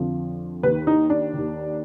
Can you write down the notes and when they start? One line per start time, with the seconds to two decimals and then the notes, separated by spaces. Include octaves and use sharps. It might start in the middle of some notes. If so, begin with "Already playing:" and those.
Already playing: F2 D3 F3
0.63 D#2 D#3 B4
0.87 D#4
1.10 D4
1.33 D#2 D#3